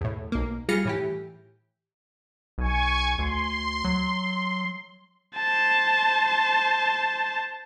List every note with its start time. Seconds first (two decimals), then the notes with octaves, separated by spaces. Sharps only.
0.01 E2 A2
0.32 B1 A#3
0.69 G3 F4 G#4 F6 A#6 C#7
0.85 A2 E3 G4
2.58 B1 G#5 C#6 G#6
3.19 D2 C6
3.84 F#3
5.36 C5 A5